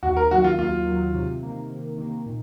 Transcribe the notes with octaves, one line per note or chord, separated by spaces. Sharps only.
D#2 F#4
A#4
D#3 F#3 F#4
F4
D#2 F4
D#3 F#3
C3
D#3 A#3
C3
D#3 A#3
A#2